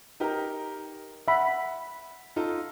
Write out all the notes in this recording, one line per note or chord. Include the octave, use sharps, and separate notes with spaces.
D#4 G4 A#4
E5 F#5 B5
D#4 F4 A4